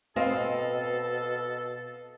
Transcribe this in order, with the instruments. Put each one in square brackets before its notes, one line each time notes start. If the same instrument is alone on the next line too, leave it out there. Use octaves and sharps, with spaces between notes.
[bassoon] B2 [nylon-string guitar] C4 [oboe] A4 [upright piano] D#5 F5